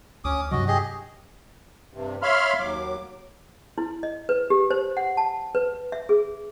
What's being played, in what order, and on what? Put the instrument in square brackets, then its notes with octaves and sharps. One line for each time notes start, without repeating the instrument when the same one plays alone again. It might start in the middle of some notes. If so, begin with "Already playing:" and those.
[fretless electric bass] D2 [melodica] C#4 D6 D#6
[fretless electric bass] G2 C3 F#3 [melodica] F#4 D#5
[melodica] G4 G#4 D#5
[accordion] G2 C3
C#5 E5 F5 B5 C6 F6
D#2 F#3 D6
[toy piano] E4
D#5
B4
G4
C5
F#5
A5
B4
E5
G#4